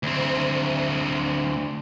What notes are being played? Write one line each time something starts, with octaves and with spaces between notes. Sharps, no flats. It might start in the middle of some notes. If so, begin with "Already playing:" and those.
D2 C4